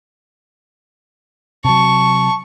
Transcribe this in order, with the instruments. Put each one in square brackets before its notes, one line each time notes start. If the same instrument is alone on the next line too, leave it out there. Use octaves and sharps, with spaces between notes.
[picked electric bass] C3 F#3 [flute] A5 [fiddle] C#6